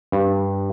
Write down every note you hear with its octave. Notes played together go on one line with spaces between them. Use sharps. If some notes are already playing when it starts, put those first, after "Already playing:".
G2